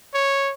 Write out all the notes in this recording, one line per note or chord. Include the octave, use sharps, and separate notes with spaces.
C#5